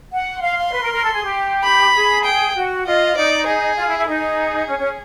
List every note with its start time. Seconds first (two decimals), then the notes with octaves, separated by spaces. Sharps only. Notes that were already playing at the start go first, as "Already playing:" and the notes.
0.12 F#5
0.42 F5 C6
0.57 F5
0.73 B4
0.82 A#4
0.93 A#4
1.04 A4
1.14 G#4
1.24 G4
1.64 B5
1.95 G#4
2.25 G5
2.55 F#4
2.86 F4 D#5
3.16 D#4 D5
3.47 G#4
3.77 F4
3.88 E4
3.98 E4
4.08 D#4 G#4
4.68 C#4
4.79 C#4